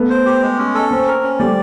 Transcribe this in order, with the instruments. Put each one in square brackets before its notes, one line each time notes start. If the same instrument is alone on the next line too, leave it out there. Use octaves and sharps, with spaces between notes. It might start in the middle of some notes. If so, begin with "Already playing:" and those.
Already playing: [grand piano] A3 B3
[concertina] C5
G4
G#3
C#4
A4
[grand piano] A#3 C4 [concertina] C#4
[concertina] A#4
C#4
[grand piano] G3 A3 [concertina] D5